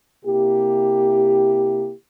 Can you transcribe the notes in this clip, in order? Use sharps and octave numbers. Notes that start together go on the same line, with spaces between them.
C3 A#3 E4 G4